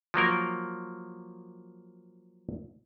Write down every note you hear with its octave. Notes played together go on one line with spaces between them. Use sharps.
F3 F#3 A#3 A#4